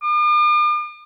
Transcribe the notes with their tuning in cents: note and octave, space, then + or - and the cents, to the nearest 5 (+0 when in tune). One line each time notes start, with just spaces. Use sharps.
D6 +45